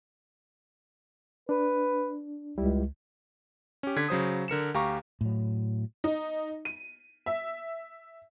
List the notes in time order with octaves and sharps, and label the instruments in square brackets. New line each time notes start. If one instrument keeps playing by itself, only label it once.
[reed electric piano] D4 [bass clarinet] B4
[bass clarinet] C#2 [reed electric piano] G3 E4
[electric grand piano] C#4 G4
D3 G#6 B6
C#3 F#3 C5 D#6
D3 A#4 C#7 E7
D2 G4 F5 A#5 C#6
[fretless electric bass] A2 F#3
[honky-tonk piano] D#4
D#7
E5